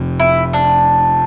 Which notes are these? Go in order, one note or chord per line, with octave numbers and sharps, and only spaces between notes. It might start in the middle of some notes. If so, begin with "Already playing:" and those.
Already playing: F1 F2 C3 F3
E4
D4